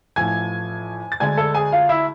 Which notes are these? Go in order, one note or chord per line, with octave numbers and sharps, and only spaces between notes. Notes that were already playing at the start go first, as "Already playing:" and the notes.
A1 A2 F3 A3 G#5 G#6
A6
D2 D3 G#3 G#5 G#6
A4 A5
G#4 G#5
F4 F5
E4 E5